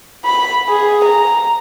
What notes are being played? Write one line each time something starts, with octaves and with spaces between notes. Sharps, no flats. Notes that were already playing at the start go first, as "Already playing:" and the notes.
B5
G#4
A#5